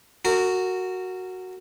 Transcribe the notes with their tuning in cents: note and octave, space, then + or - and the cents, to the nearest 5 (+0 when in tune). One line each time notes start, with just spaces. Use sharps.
F#4 +0 A#4 -25